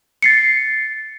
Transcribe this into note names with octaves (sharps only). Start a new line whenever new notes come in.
A6 C7 C#7